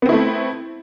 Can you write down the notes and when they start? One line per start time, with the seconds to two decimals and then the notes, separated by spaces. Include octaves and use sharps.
0.02 B3
0.06 C4
0.09 E4
0.12 A3